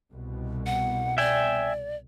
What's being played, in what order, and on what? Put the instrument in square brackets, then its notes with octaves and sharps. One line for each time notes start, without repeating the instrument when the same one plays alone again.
[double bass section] C2 B2
[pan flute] F#5
[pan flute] D5 [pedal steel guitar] E5 G5 G#5